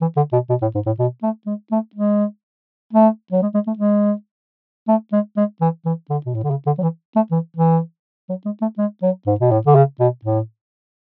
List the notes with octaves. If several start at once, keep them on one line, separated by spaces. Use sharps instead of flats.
E3
D3
B2
B2
A2
G#2
A2
B2
A3
G#3
A3
G#3
A3
F#3
G#3
G#3
A3
G#3
A3
G#3
G#3
E3
E3
D3
B2
A2
D3
C#3
D3
F#3
E3
A3
E3
E3
F#3
G#3
A3
G#3
F#3
G#2
B2
A2
D3
C#3
B2
A2